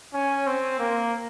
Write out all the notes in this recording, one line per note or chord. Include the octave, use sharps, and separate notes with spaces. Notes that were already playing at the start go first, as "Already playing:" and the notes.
C#4
C4
A#3